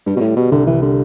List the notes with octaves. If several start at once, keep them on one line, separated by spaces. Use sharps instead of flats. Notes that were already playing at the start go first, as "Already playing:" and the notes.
G2 G3
B2
A2 G3
B2 G3
C2 D3
C2 E3
D3 G3